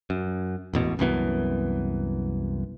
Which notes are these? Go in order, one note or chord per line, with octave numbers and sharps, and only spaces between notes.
F#2
E1 A1 B2
C2 F#2 E3 B3